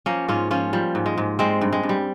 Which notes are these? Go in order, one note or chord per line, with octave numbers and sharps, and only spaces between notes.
F3 A#3 C#4
G#2 C#4 F4
F3 C#4 F4
F3 G3
G#2
G#3
G#2
G3 G#3 C4
G2
G#3
G2
G3